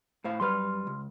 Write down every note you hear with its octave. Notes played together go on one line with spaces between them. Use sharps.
A2 C5 F5
F#2 G3 B4 C6 F6
C#2